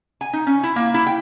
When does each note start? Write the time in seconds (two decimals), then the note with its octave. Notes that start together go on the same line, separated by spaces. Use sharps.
0.21 G#5
0.33 D#4
0.47 C#4
0.63 E4
0.76 A#3
0.94 E4
1.06 G5